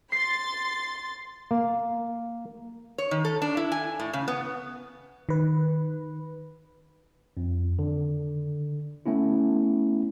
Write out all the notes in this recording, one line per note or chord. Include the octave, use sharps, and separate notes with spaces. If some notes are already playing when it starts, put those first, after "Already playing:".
C6 A6 C7
A#3
C#5
D#3
A4
D4
E4
G#5
A2
C#3
B3
D#3 B4
F2
D3
A3 B3 C#4 E4